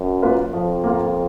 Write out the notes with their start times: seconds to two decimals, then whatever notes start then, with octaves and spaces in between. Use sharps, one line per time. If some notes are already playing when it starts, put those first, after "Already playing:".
Already playing: F#2
0.22 A#3 F4 B4
0.53 F2 F3
0.84 A#3 F4